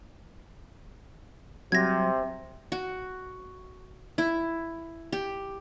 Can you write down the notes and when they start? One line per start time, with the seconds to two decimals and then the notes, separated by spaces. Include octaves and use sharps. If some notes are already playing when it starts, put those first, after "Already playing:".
1.72 C3 F#3 G3 C4 G#6 A#6
2.72 F#4
4.18 E4
5.12 G4